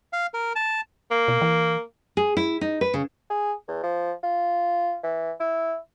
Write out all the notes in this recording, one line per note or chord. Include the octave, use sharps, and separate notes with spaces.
F5
A#4
A5
A#3
B2
E3
G#4
E4
D#4
B4
C#3
G#4
E2
F3
F4
E3
E4